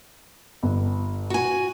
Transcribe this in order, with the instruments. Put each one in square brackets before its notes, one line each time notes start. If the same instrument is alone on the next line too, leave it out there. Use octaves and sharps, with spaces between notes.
[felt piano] G1
[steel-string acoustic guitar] F#4 G#5